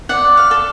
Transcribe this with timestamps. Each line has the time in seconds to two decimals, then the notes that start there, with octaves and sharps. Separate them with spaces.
0.09 D5 F#5
0.37 F5
0.51 A4